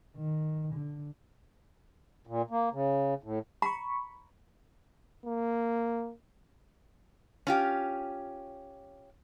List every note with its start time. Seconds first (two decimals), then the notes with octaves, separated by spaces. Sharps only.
0.17 D#3
0.74 D3
2.27 A#2
2.51 A#3
2.73 C#3
3.23 A2
3.62 A#5 B5 C#6
5.26 A#3
7.47 C#4 F4 G4